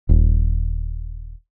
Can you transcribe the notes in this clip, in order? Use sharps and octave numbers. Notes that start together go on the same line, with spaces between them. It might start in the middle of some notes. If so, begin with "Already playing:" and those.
D#1